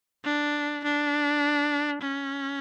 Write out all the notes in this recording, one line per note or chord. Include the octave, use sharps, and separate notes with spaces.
D4
D4
C#4